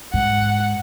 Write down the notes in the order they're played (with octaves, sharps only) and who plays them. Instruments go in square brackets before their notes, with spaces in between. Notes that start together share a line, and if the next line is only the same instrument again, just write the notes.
[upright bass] G#2 [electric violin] F#5